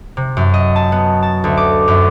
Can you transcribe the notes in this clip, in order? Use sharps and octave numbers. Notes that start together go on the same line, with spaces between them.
C3
F#2
D#5
A5
B3
A5
D2
D6
F#2